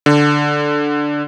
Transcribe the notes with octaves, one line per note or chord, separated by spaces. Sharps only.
D3